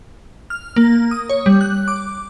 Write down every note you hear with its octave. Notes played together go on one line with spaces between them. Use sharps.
F6
A#3
D#6
C#5
G3
F#6
D6